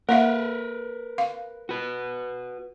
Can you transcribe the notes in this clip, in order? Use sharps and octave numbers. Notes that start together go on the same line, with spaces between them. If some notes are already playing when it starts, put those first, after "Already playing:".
A#3 A#4 B4 E5 F5
F5
F#4 B4